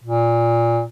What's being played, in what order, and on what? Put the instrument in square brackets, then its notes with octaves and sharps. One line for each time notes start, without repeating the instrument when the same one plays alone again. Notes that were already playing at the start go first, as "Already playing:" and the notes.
[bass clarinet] A#2